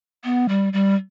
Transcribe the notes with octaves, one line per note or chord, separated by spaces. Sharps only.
B3
G3
G3